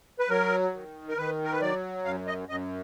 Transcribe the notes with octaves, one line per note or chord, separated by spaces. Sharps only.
B4
F#3 A#4
D#3
A#4
D#3 B4
A#4
B4
F#3 D5
F#2 F5
D#5
F#2 D#5